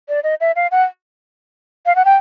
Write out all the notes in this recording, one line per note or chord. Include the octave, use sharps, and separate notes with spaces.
D5
D#5
E5
F5
F#5
F5
F#5
G5